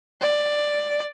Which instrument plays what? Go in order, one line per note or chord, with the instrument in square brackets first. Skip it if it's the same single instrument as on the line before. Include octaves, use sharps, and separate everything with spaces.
[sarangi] D5